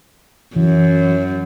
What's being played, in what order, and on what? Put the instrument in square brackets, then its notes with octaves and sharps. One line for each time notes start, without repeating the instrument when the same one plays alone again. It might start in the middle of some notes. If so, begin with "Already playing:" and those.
[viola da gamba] F#2 [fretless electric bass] E3